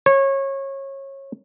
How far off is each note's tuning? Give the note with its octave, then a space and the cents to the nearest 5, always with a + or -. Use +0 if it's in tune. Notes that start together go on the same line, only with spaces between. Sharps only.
C#5 -25